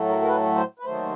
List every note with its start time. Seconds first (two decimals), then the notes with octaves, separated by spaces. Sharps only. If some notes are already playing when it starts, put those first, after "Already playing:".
Already playing: A2 F#3 A3
0.09 A#4
0.22 A#4
0.28 B4
0.56 C5
0.79 B4
0.85 D#2 D#3 F#3 A3 C5